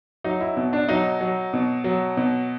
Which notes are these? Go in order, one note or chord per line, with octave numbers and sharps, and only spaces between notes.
F#3 D#4
E4
B2
D4
F#3 D#4
F#3
B2
F#3
B2